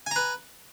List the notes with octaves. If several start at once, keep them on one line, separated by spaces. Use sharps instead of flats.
B4 G#5 A#5